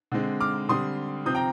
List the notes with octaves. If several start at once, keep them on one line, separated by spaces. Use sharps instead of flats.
D3 G#3 C4
D6 F6
D3 G3 C4 C6 D#6
C3 F3 C4 D#6 G6
G5 A#5